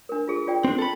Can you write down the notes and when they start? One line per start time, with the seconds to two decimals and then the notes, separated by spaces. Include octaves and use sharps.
0.09 D4 A#4
0.28 F4 G#4 A4
0.47 F4 D5 G5
0.65 C4 D4
0.79 A4 B5